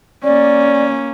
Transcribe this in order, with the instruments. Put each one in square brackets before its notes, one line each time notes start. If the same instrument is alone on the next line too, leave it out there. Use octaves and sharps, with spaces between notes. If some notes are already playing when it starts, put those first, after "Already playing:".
[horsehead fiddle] A#3 C#4 [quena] D5